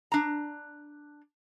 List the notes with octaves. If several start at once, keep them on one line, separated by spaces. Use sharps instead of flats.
D4 A#5